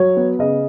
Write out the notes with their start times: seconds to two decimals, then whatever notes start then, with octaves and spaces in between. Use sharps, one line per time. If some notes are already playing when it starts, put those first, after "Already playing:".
Already playing: F#3 C#5
0.17 B3
0.39 C#3 D#5